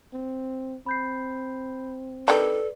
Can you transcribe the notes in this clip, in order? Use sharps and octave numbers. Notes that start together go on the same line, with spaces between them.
C4
C4 B5 G6 C7
D#3 G3 D4 A4 B4 D5